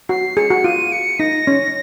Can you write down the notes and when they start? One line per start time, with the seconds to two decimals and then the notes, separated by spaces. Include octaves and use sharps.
0.09 F#4 C7
0.36 G#4 C#7
0.50 F#4
0.64 F4 D#7
0.92 C#7
1.19 D#4 A#6
1.47 C#4